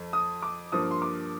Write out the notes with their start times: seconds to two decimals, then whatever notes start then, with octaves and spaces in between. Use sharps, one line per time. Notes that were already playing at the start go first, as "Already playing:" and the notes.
Already playing: F2
0.13 D#6
0.42 D6
0.72 G2 F3 A#3 D#6
0.91 C6
1.02 D6